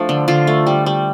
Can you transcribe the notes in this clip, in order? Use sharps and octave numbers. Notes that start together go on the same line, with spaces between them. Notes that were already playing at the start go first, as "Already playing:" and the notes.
Already playing: F3 A3 D4
D3
D3 F4
A3
G3
G3